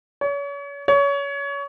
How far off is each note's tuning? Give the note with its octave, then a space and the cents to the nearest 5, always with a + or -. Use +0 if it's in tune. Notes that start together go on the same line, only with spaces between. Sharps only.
C#5 +35
C#5 +25